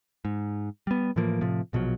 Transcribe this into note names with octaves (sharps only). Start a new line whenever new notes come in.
G#2
G3 B3
A2 E3 F3 A#3
A2 C3 F3
A#1 B2 F3 F#3